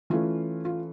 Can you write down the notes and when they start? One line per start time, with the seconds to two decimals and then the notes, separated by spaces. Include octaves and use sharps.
0.10 E3 A3 C#4 F4
0.65 F4